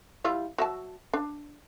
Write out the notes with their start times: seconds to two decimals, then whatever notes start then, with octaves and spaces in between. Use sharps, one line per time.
0.24 G3 E4 F4
0.58 F#3 E5 A5
1.13 D4